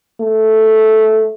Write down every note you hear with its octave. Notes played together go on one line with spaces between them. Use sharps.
A3